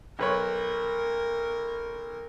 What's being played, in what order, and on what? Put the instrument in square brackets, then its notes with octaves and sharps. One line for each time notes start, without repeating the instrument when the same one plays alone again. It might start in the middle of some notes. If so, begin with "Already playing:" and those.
[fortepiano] B1 B4 C#5 [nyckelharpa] A#4